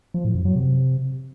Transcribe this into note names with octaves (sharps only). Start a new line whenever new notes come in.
F3
A2
F#2
F#3
C3